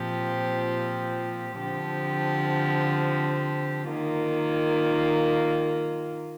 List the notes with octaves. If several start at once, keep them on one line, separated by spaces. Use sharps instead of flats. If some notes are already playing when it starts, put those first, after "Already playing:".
Already playing: A#2 F3 C4 G4
D3 F3 C4 G4
D#3 A#3 F4